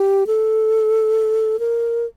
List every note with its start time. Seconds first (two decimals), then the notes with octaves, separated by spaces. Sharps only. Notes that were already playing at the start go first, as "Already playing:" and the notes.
Already playing: G4
0.27 A4
1.59 A#4